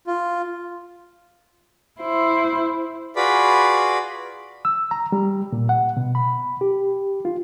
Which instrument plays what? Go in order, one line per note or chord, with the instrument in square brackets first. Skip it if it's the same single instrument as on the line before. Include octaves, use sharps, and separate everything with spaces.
[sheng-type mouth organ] F4
[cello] E4 C5
[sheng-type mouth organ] F4 F#4 G#4 B4 D5 B5
[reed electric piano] E6
A#5
G3
A#2
F#5
B2
B5
G4
F4